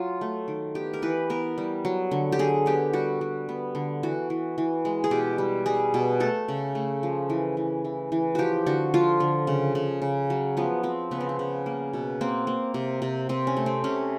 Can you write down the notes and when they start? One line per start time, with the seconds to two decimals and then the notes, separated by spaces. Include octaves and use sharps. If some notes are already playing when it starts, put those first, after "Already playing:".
Already playing: F#3 F4
0.21 A3
0.48 D#3
0.75 B3 G4
0.93 A#4
1.02 E3 B4
1.30 B3 A#4
1.58 G3
1.85 F#3
2.11 D3
2.32 G4
2.39 D3 G#4
2.66 B3 G4
2.93 G3 F#4
3.21 G3
3.49 B3
3.75 D3
4.03 E3 F#4
4.30 E3
4.58 E3
4.85 G#3
5.04 G#4
5.11 B2 G4
5.38 G3
5.66 G3 G#4
5.94 B2
6.20 A3 A4
6.48 C#3
6.75 A3
7.03 F3
7.30 E3
7.57 E3
7.85 E3
8.12 E3
8.35 F3 F#4 G4
8.66 D3 F#4
8.94 F3 F4
9.20 D3
9.47 C#3
9.75 C#3
10.02 C#3
10.30 F#3
10.57 F3 B3
10.83 F3 C4
11.11 C#3 B3
11.20 C4
11.29 B3
11.39 C#3
11.66 A#3
11.93 B2
12.21 A#3 C4
12.47 A#3
12.74 C3
13.02 C3
13.29 C3 C4
13.47 C#4
13.57 A3
13.66 C4
13.84 C3 C#4